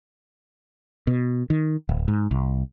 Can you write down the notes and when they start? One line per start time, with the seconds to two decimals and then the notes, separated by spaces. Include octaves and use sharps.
1.07 B2
1.50 D#3
1.89 D1
2.08 G#2
2.31 C2